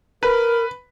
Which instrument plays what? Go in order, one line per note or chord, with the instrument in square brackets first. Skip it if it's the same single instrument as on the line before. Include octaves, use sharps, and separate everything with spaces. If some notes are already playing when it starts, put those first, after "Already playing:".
[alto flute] A#4 [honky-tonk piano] B4